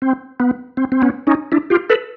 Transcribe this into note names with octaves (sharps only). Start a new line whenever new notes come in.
C4
B3
C4
C4
B3 C#4
C#4 D#4
D4 E4
F4 G4
A4 B4